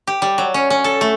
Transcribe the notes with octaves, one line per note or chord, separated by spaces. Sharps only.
G4
G3
F#3
C#4
C#4
A4
A3